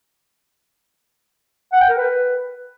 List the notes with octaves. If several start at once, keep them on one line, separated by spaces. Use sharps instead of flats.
F#5
G5
A#4
B4